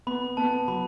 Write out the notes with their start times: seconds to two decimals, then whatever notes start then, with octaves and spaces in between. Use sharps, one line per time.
0.07 B3 B5
0.37 B3 A5
0.68 F#3 B5